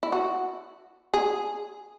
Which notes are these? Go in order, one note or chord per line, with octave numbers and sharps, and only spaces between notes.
E4
F#4
G#4